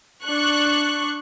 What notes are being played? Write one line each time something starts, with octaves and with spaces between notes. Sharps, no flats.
D4 C#6 F#6